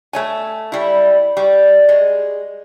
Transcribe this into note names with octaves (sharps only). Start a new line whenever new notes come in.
A3 C#5 G#5
G3 E4
G3
G#3